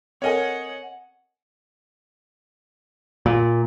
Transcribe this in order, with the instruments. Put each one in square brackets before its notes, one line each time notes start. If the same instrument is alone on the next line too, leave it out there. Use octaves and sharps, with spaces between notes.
[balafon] C4 A4 A#4 [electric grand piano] C#5 D#5 G#5 [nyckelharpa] F#5
[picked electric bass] A#2